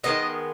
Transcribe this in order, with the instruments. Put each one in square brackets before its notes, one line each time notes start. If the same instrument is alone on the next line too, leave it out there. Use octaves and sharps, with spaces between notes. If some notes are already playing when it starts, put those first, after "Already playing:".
[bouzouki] D#3 G#3 B3 D#5